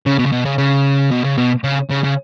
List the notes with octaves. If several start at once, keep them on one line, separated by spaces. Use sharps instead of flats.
C#3
B2
C#3
B2
C#3
C#3
B2
C#3
B2
C#3
C#3
C#3